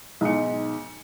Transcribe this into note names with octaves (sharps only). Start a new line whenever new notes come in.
B1 G#2 C#7